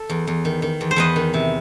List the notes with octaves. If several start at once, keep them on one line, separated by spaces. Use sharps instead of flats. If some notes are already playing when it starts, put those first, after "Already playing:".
Already playing: A4
E2
E2
D#3
D#3
E2
C5
E2 B4 D#5
D#3
C3